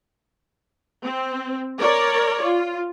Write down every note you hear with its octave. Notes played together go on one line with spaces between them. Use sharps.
C4
A#4 C#5 D5
F4